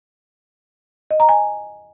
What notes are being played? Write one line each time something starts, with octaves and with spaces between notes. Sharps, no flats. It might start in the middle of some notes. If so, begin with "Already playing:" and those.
D#5
A#5
G#5